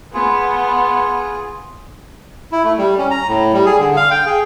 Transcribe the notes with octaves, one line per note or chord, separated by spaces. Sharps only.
B3 F4 G#4
E4
A3
G3
C#4
A#5
A2
G3
G#4
D3
F5
G5
G#4